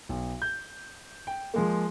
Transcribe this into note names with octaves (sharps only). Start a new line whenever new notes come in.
B1
G6
G5
F3 G#3 A#3